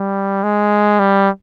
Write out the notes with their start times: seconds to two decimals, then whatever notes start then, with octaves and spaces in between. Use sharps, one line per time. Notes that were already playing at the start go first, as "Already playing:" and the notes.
Already playing: G3
0.43 G#3
1.00 G3